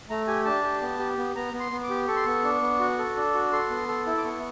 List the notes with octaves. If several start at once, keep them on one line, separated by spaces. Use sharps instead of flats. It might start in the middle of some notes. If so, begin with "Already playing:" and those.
A3 A#5
G4 G#5
D4 A5
G4
B3
G4
B3
B3 A#5
B3
C6
B3
D6
G4
A4 C#6
C6
B3 C#6
D4
B3
F#4
A4
D4
F#4
A4 C6
B3
A4
E4
D6
B3 C#6